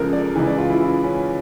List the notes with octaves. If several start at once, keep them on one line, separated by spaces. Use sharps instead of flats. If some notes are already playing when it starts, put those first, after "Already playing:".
Already playing: C#2 C#3 F3 A4 A#4
D5
C#2 C#3 E3
D5
F4
E4
E4
C#4